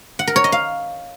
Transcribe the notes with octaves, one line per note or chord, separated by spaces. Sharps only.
F#5
A#4
C#5
D#5
F5